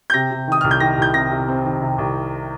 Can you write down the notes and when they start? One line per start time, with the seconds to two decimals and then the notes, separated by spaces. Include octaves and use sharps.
0.10 G6
0.14 C3 A#6
0.31 C3
0.47 D#3 D#6
0.61 C2 F6
0.71 G6
0.80 D#3 A#6
0.97 C2 G6
1.14 C3 A#6
1.31 C3
1.48 C4
1.65 D#3
1.81 C3
1.98 C2